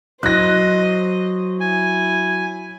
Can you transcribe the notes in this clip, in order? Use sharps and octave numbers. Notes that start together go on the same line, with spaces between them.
F#3 C5 D#5 F#6 A#6
E4 G#5